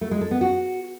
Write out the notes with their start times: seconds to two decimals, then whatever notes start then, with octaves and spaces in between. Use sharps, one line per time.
0.01 A3
0.11 G#3
0.21 A4
0.31 B3
0.41 F#4